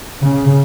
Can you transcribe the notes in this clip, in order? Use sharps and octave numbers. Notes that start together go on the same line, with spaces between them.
C#3